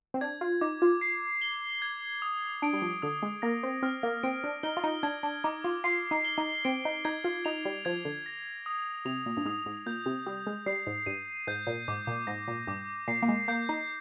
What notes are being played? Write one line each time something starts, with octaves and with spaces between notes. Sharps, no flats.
C4
D4 G#6
F4
D#4 D6
F4
C7
G7
G#6
D#6
D4 D7
G3
F3
D3 D#6
G#3
A#3 A#6
C4
C4 F6
A#3
C4 D7
D4
D#4 G7
F4
D#4
D4 G#6
D4
D#4 D6
F4
F4 C7
D#4
G7
D#4
C4 D7
D#4
D#4 G#6
F4
D#4 F7
G3
F3 G#6
D3
A#6
D#6
C3 F7
A#2
G2
G#2 D#6
G#2
A#2 G6
C3
G3 D#6
G#3
G3 C7
G#2
G2 D#7
G#2 G6
A#2
G#2 D6
A#2
G#2 A#6
A#2
G2 D6
A#2 C7
A#3
G#3
A#3 G6
D#4